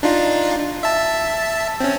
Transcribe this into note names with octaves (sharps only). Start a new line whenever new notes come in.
D4 D#4 F4
E5 A5
C4 C#4